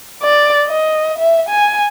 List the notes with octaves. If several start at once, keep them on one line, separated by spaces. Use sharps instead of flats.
D5
D#5
E5
G#5